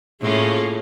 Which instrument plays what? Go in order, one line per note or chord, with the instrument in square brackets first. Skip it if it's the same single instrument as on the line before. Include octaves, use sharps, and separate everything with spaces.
[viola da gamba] A2 [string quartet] A#3 C#4 F4 [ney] G#4